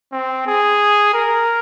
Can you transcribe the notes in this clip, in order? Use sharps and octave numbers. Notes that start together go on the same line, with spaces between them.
C4
G#4
A#4